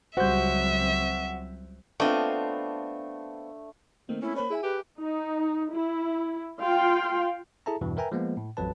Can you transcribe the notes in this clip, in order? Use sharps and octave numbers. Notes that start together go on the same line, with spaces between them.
C#2 F#3 G3 C4 F#4 C5 E5 G6
A3 B3 C4 D4 F4 D#5
D#3 A3 A#3 C4
C#4 E4
A#3 C5 C#5 B5
E4 G#4 E5 G#5
G4 B4
D#4
E4
F4 F5 G5 C6
E4 G#4 A4 E5 A5 A#5
E2 G2 B2 E3
A#4 B4 E5 G5 G#5 A#5
F3 G#3 A#3 B3
A2
A1 F2 F#3 B4 A5